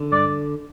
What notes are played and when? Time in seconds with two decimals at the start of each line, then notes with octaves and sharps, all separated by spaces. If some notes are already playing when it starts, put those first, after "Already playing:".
Already playing: D3
0.12 G2 D5